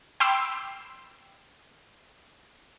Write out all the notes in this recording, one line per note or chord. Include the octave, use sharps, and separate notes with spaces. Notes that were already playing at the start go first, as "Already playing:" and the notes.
G5 B5 C6 D6 E6